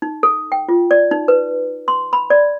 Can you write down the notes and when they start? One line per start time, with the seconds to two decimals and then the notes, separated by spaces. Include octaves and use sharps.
0.02 D#4
0.23 A4
0.52 G5
0.68 F4
0.91 D5
1.11 D#4
1.28 B4
1.88 C6
2.13 B5
2.30 D5